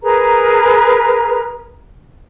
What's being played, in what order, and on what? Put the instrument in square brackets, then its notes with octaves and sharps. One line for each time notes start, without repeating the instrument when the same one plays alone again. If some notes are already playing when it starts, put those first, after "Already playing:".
[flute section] G#4 A#4 B4 A#5